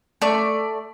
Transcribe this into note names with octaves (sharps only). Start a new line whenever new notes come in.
A3 D5